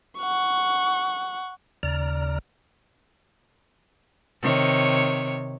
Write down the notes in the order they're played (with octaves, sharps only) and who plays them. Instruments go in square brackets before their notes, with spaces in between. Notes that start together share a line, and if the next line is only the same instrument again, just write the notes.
[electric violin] F#5 C#6
[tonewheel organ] D#2 C#3 D5 A#5 F6
[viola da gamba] C3 D#3 C#5